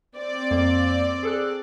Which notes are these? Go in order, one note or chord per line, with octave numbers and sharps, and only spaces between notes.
C4 D5
F2 A#3
G#4 A4 F#6